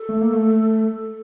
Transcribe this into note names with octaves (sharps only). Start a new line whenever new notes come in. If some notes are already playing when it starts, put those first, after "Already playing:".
Already playing: A4
A3
A#3
A3